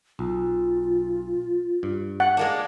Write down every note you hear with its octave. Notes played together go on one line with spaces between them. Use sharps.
B1 F4
G2
F#5
G#3 A#3 D4